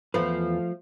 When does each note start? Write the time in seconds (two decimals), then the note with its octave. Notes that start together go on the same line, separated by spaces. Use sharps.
0.14 E2 F3 A3 F4 B4